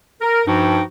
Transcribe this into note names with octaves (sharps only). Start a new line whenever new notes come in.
A#4
G2 F3 D#4 F#4 G5